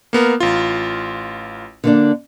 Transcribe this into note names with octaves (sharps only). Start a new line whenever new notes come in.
A#3 B3 A#4
A1 F4
D3 A#3 D4